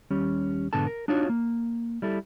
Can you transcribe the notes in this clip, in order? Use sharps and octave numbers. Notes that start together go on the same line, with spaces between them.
D#2 G3 C#4
B1 G#2 D3 B3 A4 A5
A#4
D4 D#4 F4 F#4 C#5
A#3
G3 E4 A4